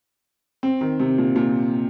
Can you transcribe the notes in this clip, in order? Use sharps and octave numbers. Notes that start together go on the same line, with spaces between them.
C4
D#3
C3
A#2
A#2